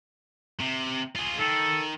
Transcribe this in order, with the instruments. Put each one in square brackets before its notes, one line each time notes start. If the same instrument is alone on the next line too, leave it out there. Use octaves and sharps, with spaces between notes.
[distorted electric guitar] C3
F4 G#4
[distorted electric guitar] D#3 [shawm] A4